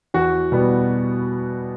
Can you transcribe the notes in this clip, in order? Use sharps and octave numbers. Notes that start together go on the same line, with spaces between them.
E2 F#4
B2 G3 B3